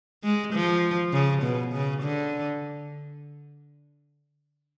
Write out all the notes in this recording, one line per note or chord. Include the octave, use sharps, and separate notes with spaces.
G#3
F3
C#3
B2
C#3
D3